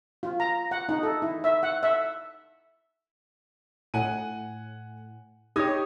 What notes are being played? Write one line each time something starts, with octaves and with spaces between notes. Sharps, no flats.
F4
A#5
F#5
D#4
A4
E4
E5
F#5
E5
A2 F#5 G#5 D#7
D#4 G4 C#5 D#6 G#6